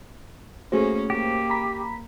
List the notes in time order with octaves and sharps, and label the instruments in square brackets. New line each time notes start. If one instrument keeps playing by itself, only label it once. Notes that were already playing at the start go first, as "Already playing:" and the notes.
[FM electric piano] A3 C5 [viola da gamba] A#3 C#4 [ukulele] F#4 G#4
[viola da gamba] A#3 [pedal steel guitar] G4
[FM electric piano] A#5 B5 B6